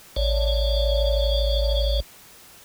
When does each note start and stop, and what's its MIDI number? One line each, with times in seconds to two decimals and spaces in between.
0.16 2.00 33
0.16 2.00 73
0.16 2.00 74